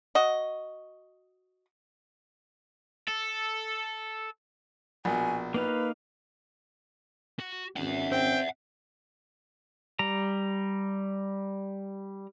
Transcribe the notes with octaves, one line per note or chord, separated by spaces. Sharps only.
F#4 D#5
A4
A#1 B2 G#5
A#3 D#4 B4 F5
F#4
G#1 C#4 E5 F#5
C4 G5
G3 A#5